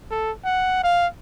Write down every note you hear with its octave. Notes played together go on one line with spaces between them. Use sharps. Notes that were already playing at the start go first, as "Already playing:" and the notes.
A4
F#5
F5